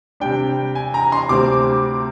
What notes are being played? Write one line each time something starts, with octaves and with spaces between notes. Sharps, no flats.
C3 G3 D4 G5
G#5
A#5
C6
D2 C3 G3 C4 D6